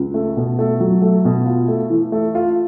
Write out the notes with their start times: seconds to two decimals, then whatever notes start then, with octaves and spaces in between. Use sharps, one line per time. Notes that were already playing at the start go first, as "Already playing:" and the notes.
Already playing: C#2
0.14 A3
0.37 B2
0.59 A3
0.80 F#3
1.02 A3
1.25 B2
1.46 F4
1.68 A3
1.90 E3
2.12 A3
2.35 F4